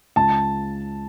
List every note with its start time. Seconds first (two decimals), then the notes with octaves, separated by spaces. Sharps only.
0.16 C#2 A5